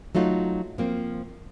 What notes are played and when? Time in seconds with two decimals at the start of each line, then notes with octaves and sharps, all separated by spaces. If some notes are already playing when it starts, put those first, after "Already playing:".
0.15 F#3 A3 D#4 F4 F#4
0.78 F3 A#3 C4